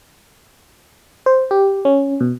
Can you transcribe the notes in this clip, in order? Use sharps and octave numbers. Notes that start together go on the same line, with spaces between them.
C5
G4
C#4
B2